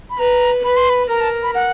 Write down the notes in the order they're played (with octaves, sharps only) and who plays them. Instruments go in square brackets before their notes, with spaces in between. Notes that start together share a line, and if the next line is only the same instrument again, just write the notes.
[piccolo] B5
[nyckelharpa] B4 [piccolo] A#5
[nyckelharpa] B4 [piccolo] B5
[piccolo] C6
B5
[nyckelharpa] A#4 [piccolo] A#5
[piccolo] A5
B5
F#5